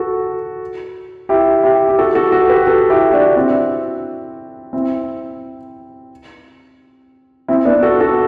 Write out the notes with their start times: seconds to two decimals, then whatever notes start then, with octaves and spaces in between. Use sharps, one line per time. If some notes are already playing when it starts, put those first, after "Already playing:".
Already playing: F#4 A4
1.29 E4 G4
1.63 E4 G4
1.89 G4
1.99 F#4 A4
2.15 F#4 A4
2.32 F#4 A4
2.49 G4 B4
2.67 F#4 A4
2.90 E4 G4
3.13 D4 F#4
3.36 C4 E4
4.73 C4 E4
7.48 C4 E4
7.65 B3 D4
7.83 F#4 A4
8.00 F#4 A4